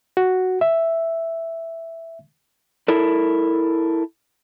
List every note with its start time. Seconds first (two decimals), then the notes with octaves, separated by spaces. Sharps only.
0.17 F#4
0.61 E5
2.88 E4 A4 A#4